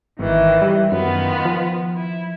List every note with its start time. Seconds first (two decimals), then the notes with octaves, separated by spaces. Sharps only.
0.19 G#1 D#3 E3
0.62 G3
0.92 F#2 D#3 B3 F4
1.45 F3
1.96 E4